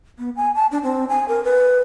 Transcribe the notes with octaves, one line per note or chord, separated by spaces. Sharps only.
B3
G#5
A5
D4
C4
G#5
A#4
B4